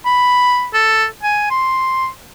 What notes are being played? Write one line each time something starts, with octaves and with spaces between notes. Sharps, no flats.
B5
A4
G#5
C6